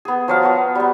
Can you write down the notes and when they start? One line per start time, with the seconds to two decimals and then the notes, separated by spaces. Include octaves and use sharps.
0.05 B3 G#4
0.28 F3 F#3 F5
0.43 B3 F#4
0.75 G3 B3